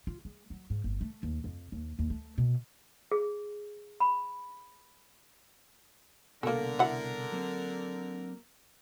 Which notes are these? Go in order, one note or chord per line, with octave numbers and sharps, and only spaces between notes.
F4
G#3
F#3
G#2
G1
A3
D#2
F2
D#2
D#2
A3
B2
G#4
B5
C2 F#2 B2 D3 A#3 A4 A#4
E4 F#5
F#3 A#3 C4